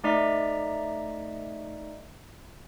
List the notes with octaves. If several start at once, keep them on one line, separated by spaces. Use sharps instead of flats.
A3 D#4 D5 D#5 A#5 B6